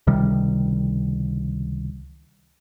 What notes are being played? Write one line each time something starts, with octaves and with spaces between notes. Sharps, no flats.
C#2 C3 D#3 G3